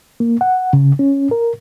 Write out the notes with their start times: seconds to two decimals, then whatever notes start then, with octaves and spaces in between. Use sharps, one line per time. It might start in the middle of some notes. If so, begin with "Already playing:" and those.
0.20 A#3
0.41 F#5
0.73 C#3
0.99 C#4
1.31 A#4